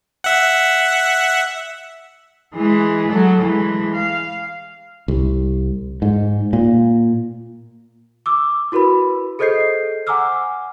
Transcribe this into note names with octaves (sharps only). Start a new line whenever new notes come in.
E5 F#5
E3 G#3
F#3 A4
E3 G#3
F5
C2
G#2
A#2
D6 E6
E4 F#4 A#4 B4 B5
G#4 A4 C5 D#5 G6 C7
F#5 G#5 A#5 D6 E6 F6